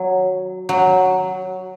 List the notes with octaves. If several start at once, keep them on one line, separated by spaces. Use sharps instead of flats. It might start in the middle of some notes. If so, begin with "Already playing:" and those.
Already playing: F#3
F#3